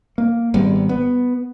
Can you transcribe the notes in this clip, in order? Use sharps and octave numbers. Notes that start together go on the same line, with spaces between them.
A#3
G#1 G3 B3
B3